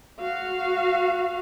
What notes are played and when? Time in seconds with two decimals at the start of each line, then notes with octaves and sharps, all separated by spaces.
0.20 F#4 F5